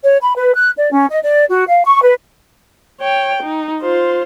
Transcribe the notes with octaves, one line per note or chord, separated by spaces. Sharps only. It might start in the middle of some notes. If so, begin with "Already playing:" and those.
C#5
B5
B4
F#6
D5
C#4
D#5
D5
F#4
F5
C#6
B4
C#5 G5
D#4
F4 C5